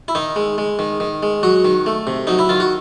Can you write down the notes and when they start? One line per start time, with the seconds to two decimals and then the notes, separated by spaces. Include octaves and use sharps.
0.08 E4
0.15 D#3 D#4
0.36 G#3
0.58 G#3
0.79 D#3
1.00 D#3
1.23 G#3
1.43 F#3 F#4
1.64 D#3
1.86 A3
2.07 C3
2.27 F#3 D#4
2.39 E4
2.49 D#3 F4
2.60 F#4